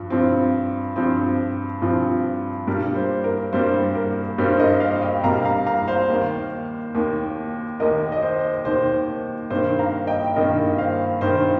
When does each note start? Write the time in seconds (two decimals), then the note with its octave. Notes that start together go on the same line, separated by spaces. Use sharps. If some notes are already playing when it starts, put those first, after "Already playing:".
Already playing: G2 F3
0.10 G2 F3 C4
0.96 G2 F3 C4 C5
1.82 G2 F3 C4
2.67 G2 G3 A#3 A#4
2.96 C5
3.24 A#4
3.53 G2 G3 A#3 C5
3.95 A#4
4.38 G2 G3 A#3 C5
4.53 C5
4.59 A#4 D#5
4.80 C5 F5
5.02 D#5 G5
5.24 G2 G3 A#3 F5 A#5
5.45 F5 A#5
5.67 F5 A#5
5.88 C5 F5
6.09 D#2 D#3 A#3
6.94 D#2 D#3 A#3
7.80 D#2 D#3 A#3 A#4 D#5
8.12 D#5
8.22 C5
8.65 D#2 D#3 A#3 C5
9.50 G2 D#3 A#3 C5
9.79 F5 A#5
10.07 D#5 G5
10.36 G2 D#3 A#3 A#4 D#5
10.78 C5 F5
11.21 G2 D#3 A#3 C5
11.35 A#4